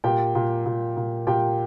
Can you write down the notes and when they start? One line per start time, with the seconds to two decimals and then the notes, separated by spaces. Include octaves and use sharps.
0.04 A#2 G4 G5
0.35 A#2
0.65 A#2
0.97 A#2
1.27 A#2 G4 G5